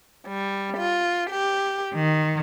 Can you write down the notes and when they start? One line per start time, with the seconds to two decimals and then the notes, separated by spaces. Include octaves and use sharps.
0.28 G3
0.78 F4
1.30 G4
1.95 D#3